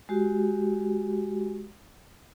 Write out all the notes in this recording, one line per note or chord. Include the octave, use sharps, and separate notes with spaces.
G#3 F#4 G4